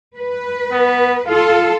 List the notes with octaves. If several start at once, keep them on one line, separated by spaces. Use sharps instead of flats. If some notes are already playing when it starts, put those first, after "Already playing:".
B4
B3
F4 A4 F5